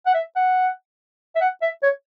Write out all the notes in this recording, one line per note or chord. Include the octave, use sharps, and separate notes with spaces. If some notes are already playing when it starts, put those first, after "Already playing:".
F#5
E5
F#5
E5
F#5
E5
C#5